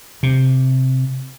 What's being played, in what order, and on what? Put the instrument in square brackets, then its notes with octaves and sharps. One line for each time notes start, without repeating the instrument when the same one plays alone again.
[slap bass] C3